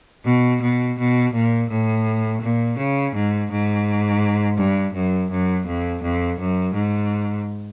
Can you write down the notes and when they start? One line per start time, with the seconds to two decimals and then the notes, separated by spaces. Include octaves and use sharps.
0.25 B2
0.61 B2
0.98 B2
1.33 A#2
1.69 A2
2.42 A#2
2.77 C#3
3.14 G#2
3.50 G#2
4.58 G2
4.94 F#2
5.30 F#2
5.66 F2
6.03 F2
6.39 F#2
6.74 G#2